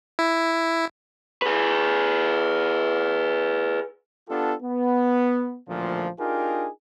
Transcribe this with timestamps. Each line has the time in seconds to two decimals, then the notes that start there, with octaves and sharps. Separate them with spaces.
0.19 E4
1.42 G#4 B4
4.29 B3 D4 F4 G4 A4
4.63 B3
5.68 A1 D2 A#2 F3
6.20 D4 D#4 F4 G4 G#4 A#4